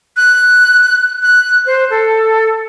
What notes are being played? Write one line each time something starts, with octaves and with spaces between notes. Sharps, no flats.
F#6
F#6
C5
A4